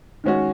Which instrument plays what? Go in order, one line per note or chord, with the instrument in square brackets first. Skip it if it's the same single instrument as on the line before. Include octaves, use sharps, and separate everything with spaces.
[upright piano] D#3 G#3 C#4 F#4